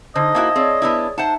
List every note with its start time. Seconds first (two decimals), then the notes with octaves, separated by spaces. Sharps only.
0.16 D3 D#4 C5 D#5
0.35 A#3 E4 F#4 F5 A5 G#6
0.56 C4 G#4 C#5 D5
0.82 B3 D4 E4
1.18 D#4 C5 E5 F#5 A5